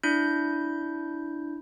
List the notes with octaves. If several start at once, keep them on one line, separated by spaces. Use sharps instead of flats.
D4 E4 G6